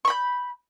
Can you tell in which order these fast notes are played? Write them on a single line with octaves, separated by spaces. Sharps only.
C#6 B5 G6